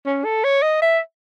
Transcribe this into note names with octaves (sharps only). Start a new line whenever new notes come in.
C#4
A4
C#5
D#5
E5